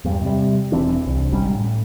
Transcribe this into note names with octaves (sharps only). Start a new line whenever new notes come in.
E2 G2
C3 G3
E1 E3 C4 D4
C2
G#1 G#2 G3 C#4
A2